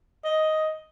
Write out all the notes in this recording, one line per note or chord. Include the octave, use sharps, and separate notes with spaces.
D#5